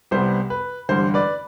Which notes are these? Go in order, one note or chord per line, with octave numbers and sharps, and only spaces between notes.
C2 C3 G3 B3 C5
B4
A1 G2 D3 C5
B4 D5